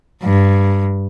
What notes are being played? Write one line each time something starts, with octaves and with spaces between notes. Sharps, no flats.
G2